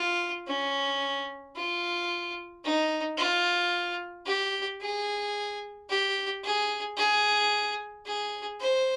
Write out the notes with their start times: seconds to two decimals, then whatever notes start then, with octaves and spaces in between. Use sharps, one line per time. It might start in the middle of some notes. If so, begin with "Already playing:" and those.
Already playing: F4
0.47 C#4
1.56 F4
2.64 D#4
3.17 F4
4.26 G4
4.81 G#4
5.90 G4
6.44 G#4
6.97 G#4
8.06 G#4
8.60 C5